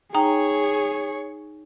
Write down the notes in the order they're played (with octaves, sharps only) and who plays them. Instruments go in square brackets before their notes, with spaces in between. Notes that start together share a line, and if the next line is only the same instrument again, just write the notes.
[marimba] D#4 G5 A#5 [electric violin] G#4 C#5